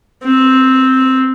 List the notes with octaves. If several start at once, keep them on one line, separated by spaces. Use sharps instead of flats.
C4